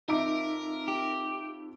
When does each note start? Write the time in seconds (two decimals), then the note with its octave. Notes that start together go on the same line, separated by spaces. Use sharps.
0.08 F2 D#4 A#4 E5 D6 D7
0.88 G4